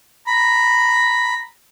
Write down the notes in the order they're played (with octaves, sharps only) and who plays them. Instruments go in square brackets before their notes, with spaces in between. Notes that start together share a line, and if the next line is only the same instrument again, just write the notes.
[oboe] A#5 [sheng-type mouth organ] B5